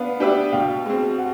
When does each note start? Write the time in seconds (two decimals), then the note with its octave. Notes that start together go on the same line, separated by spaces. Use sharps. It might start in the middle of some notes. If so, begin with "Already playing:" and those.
Already playing: B3 D4 B4 F5
0.20 D4 G4 B4 E5
0.52 B2 F5 G5
0.86 G#3 C4
1.18 F#5